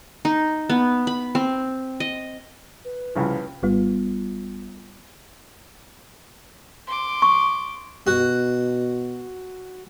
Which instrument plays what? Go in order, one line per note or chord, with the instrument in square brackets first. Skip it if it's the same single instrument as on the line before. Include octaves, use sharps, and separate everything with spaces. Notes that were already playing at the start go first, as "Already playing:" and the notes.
[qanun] D#4
B3
B5
C4
D#5
[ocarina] B4
[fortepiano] C2 C#3 F3
[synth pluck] G#1 G3 B3 F4
[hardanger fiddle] C6 D6
[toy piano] C#6
[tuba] B2 [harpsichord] F#4